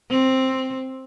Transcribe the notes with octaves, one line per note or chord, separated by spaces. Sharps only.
C4